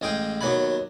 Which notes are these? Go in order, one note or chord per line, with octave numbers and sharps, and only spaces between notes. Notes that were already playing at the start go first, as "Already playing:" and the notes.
A1 G#3 G#4 F5 G5 D#6
D#2 F#3 B3 F#5 G#5 B5